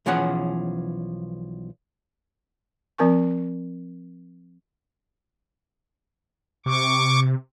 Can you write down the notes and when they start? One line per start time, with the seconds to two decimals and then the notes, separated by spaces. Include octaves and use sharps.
0.06 B1 E3 F3 C#4 G#4 F#5
2.98 F3 C4 A#4 G#5 C#6
6.66 C3 C#6 D6